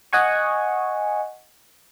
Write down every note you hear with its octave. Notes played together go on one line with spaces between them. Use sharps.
D#5 F#5 G#5 C#6